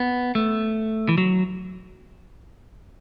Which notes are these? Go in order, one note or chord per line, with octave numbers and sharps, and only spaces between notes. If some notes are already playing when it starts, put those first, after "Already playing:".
Already playing: B3
A3
E3
F#3